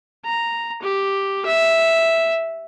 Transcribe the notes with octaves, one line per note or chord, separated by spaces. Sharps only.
A#5
G4
E5